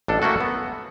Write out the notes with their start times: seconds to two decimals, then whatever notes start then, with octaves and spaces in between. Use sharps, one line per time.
0.08 A1 D4 A4
0.22 A3 A#3 C#4 F#4 A4
0.40 B3